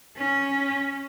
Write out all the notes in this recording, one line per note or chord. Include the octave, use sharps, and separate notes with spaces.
C#4